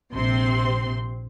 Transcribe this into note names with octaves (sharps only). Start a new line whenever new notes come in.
A#1 C3 C4 C6